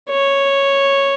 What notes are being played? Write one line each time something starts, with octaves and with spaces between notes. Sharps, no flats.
C#5